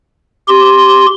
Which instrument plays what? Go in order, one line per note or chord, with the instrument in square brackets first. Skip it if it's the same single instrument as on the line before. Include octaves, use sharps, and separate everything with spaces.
[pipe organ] G4 C6